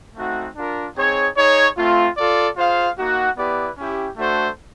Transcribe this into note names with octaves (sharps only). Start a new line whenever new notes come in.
A3 C4 D#4 F#4
D4 F4 A#4
C4 D#4 G#4 C#5
D#4 G#4 C#5
A3 C4 F4
F4 A4 D5
F4 G#4 C5 F5
A#3 D#4 F#4
B3 E4 G4 B4 D5
C#4 E4 G4
A3 D4 F#4 A4 C5